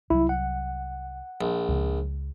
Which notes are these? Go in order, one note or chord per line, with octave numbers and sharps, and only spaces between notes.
C2 F#3 E4
F#5
A#1
C#2 C#3